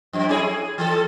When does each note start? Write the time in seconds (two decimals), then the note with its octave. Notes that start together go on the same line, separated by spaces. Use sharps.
0.13 F#2 F3
0.29 C#4 E4 G#4
0.43 G#4
0.78 E3 A4